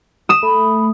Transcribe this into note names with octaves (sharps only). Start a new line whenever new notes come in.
D#6 E7
A3 B5